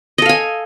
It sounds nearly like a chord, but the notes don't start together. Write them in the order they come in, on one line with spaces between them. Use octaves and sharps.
D#5 A4 F5 G#5